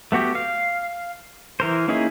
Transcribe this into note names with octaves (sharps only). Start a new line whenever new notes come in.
A3 B3 F#4 G4
F5
E3 A#4 C5
A#3 C#4 D#4 E4 G#4